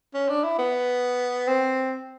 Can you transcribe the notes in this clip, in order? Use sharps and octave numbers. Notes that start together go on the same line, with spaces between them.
C#4
D4
E4
B3
C4